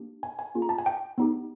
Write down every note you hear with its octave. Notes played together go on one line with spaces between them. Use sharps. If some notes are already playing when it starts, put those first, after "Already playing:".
Already playing: A#3 D4 G4
G#5
G#5
A#3 C#4 F4 G#4
A#5
A5
G#5
G5
B3 D#4 G4